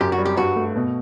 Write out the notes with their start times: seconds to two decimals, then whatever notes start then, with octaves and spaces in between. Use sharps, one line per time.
0.01 F#2 G4
0.12 F#4
0.18 G3
0.25 G4
0.37 G2 F#4
0.56 A3
0.76 B2